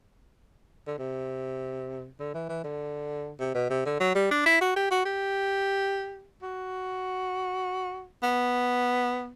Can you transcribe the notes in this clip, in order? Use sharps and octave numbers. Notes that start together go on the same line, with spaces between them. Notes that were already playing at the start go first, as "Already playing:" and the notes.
D3
C3
D3
E3
E3
D3
C3
B2
C3
D3
F#3
G3
D4
E4
F#4
G4
F#4
G4
F#4
B3